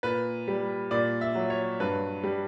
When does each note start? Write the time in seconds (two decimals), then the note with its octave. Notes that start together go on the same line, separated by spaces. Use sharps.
0.03 A#2 B4
0.48 G3
0.91 A#2 D5
1.21 E5
1.35 F#3
1.50 C#5
1.80 G2 B4
2.23 G3